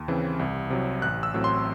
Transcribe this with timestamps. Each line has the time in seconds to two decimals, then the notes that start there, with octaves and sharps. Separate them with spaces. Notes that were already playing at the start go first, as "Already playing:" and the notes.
Already playing: D#2
0.08 C#3 E3 C4
0.39 C2
0.70 C3 F#3
1.02 A1 F#6
1.23 E6
1.34 A2 F#3 C4
1.44 C6